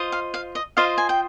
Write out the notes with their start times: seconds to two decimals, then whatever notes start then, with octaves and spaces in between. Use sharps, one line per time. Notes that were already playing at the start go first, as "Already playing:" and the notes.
Already playing: F4 C5 D#5
0.12 F5
0.34 F5
0.55 D#5
0.77 F4 C5 D#5 F5
0.98 G#5
1.09 G5